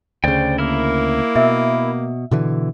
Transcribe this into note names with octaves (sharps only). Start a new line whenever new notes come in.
D2 C#3 C5 D5 G5
A#3 E4 A#4 F6
B2 E5 E6
B2 D3 E3